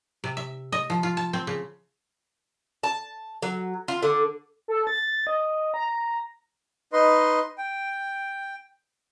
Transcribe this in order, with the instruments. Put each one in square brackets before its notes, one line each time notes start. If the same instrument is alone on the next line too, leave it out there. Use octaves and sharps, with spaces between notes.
[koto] C3
E5
D#5
F3
F4
A5
C4
C#3
[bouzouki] A5
F#3
F4
D3
[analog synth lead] A4
A6
D#5
A#5
[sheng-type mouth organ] D#4 B4 D#5 C6
G5